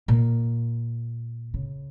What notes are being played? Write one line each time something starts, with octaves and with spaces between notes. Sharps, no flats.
A#2
C#3